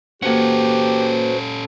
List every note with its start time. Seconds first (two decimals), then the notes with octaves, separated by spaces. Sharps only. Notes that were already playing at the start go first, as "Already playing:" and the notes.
0.22 A#3 C#4 F#4 G4 A4 B4 C5 F#5